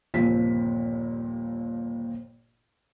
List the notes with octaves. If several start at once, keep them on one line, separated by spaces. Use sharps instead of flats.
G1 D#2 A#2 F3 C4 B6